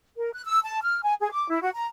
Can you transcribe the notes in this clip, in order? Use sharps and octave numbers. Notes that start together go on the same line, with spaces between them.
A#4
F#6
E6
A5
F6
G#5
G#4
D6
E4
F#4
A#5